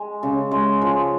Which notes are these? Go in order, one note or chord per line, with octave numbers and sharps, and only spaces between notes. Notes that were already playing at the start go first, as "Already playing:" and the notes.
Already playing: G#3
C#3
G#3
F3